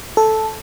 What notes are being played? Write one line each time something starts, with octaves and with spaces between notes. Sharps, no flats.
A4